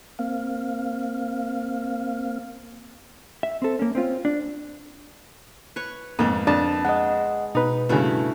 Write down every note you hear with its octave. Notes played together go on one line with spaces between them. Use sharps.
A#3 C4 F5
E5
C4 A4
A#3 C#4
C4 C#4 F4
D4
B4 C#5 C#6
F2 G#2 A#3 B3
F2 D4 A5
G#3 D#5 F#5
B2 D#4 B4
G2 C#3 A3 E4 F#4